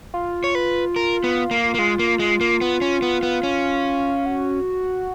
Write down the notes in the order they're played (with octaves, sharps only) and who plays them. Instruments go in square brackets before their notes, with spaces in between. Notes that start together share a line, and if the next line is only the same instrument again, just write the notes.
[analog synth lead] F4
[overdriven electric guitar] C#5
B4
A#4
B3
A#3
A#3
[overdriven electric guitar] G#3 [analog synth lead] F4
[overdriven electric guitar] A#3
G#3
A#3
B3
C#4
B3
B3
C#4
[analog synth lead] F#4